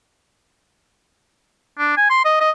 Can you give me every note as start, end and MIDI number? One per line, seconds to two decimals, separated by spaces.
1.78 1.94 62
1.97 2.06 80
2.10 2.24 84
2.25 2.36 75
2.40 2.51 75